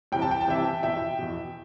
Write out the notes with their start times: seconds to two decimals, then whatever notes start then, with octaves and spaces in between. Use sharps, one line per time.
0.12 C2 C3 E3 G5
0.22 A5
0.31 G5
0.41 A5
0.47 C2 C3 E3 E5 G5
0.83 E2 B2 E5 G5
1.19 E2 B2